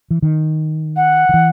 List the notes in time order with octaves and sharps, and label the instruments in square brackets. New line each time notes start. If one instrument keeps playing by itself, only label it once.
[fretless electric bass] E3
D#3
[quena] F#5
[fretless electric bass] D#3
E3